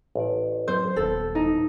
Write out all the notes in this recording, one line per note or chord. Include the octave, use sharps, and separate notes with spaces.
A1 D5
F#2 C5
D#1 B3 A4 C5
D#4